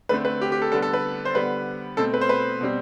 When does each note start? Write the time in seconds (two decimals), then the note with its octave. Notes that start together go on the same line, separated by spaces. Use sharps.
0.09 D3 A3 C4 B4
0.25 B4
0.41 G4
0.52 G4
0.62 A4
0.72 D3 G3 B3 A4
0.82 A4
0.93 B4
1.25 C5
1.34 D3 G3 B3 B4
1.97 B2 A3 C4 A4
2.14 B4
2.21 C5
2.29 B4
2.61 B2 G3 C4